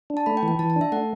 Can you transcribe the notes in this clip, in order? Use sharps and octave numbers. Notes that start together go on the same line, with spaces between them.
D4
A5
A3 B5
G5
E3
G5
E3 A5
A5
D4
E5
A3 F#5